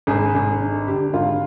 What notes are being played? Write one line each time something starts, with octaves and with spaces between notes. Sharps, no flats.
G#1 G#4
G#1
G2
D3 G4
G#1 F4